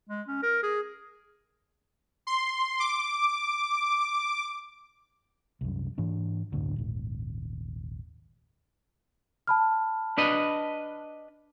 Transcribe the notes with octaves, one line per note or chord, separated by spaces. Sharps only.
G#3
C#4
A#4
G#4
C6
D6
C2 F#2
G#2 E3 D4
F#1 D2 A2 D3
D#1 G#1
A5 B5 F6
D4 B4 D#5